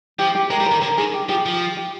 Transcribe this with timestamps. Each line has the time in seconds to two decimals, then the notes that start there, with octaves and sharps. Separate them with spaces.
0.19 F3 G4
0.35 G4
0.50 G#3 A#4
0.60 G3
0.66 A#4
0.71 D#3
0.82 D3 A#4
0.97 D#3 G#4
1.14 G4
1.29 F3 G4
1.46 F3
1.77 G4